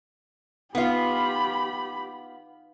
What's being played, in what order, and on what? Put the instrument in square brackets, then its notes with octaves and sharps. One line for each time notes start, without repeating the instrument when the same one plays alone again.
[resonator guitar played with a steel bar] B3 F4 [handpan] D#4 F5 [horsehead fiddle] G4 B5